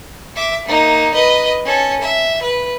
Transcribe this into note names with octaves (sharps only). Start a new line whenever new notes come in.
E5 D6
A#3 D#4
B4 D#5
C#4 A4
E5
B4